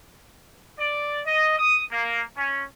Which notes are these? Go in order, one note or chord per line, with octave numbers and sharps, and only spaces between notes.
D5
D#5
D#6
A#3
C#4